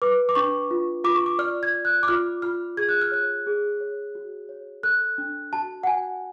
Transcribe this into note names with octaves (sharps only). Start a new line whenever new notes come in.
B4 D6
D6
D4 C#6
F4
F4 D6
C#6
D6
D5 F6
G#6
D5
F#6
D6
F4 F6
F4 F6
G#4 G#6
F#6
F6
C#5 F#6
G#4
C#5
F#4
C#5
A4 F#6
D4
F#4 A5
F#5
F#4 G#5